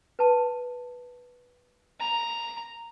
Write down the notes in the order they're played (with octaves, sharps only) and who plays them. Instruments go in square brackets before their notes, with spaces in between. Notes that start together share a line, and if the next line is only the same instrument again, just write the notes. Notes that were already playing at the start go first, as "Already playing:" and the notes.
[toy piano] B4 A5
[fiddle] A#5